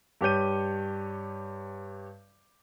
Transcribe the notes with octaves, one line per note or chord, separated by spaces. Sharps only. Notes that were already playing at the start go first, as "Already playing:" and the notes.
G2 G4 C#5 G6 D#7